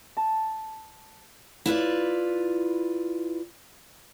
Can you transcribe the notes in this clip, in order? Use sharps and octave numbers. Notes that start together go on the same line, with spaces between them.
A5
E4 F4 B4 D5